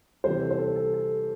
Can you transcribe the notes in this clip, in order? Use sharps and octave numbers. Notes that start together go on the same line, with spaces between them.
C3 E3 G3 C5
A4
C5
A4
A4
A4